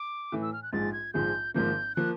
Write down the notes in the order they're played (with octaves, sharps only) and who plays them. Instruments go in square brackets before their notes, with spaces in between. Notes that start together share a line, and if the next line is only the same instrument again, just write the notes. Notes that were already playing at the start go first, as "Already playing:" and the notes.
Already playing: [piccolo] D6
[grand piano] A2 E3 A3
[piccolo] E6
F6
F#6
[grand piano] A#1 G#2 F3 G#3 [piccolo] A6
[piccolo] G#6
[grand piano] A#1 G#2 F3 G#3 [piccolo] G6
[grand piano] G#1 G#2 F3 A#3 [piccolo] G6
[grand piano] F3 A#3 [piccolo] F#6